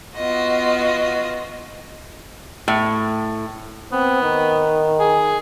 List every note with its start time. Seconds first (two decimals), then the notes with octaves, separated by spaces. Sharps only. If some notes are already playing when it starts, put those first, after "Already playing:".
0.15 B3 F4 F#4 D#5
2.68 A2
3.92 B3 C4
4.22 D#3
4.99 G#4